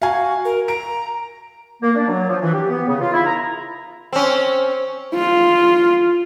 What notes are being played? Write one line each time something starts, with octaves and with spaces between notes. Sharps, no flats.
F#4 F5 G#5
A#4
A#5 D7
A#3
D4
F#3
F3
E3
G4
B3
C#3
F4
E4
A#5
C4 C#4
F4